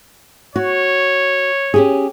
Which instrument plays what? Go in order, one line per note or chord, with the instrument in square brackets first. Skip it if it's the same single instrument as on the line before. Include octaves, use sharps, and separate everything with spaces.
[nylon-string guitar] F#4 [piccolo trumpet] C#5
[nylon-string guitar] C#4 G4 G#4